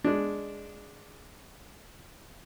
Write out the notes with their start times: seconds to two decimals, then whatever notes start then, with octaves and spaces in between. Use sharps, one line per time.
0.04 G#3 D4